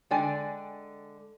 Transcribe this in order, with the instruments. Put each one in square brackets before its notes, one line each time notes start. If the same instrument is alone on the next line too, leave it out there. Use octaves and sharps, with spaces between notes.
[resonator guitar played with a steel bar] D3 G#3 D5 G5 G#5